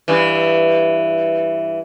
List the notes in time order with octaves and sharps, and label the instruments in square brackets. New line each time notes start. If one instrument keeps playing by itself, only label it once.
[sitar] G2 E3